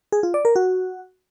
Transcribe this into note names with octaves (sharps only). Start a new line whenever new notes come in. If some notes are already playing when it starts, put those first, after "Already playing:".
G#4
F4
D5
A#4
F#4